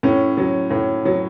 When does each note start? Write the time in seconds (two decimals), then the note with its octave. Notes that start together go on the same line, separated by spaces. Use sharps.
0.03 A2 C#4
0.37 F#3
0.70 A2
1.05 F#3